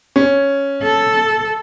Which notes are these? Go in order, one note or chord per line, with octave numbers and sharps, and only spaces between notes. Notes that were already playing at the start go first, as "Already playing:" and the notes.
C#4
A4